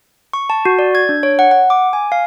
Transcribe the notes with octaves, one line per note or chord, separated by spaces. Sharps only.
C#6
A5
F#4
D5
G#6
D4
C#5
F#5
F#5
D6
G#5
F5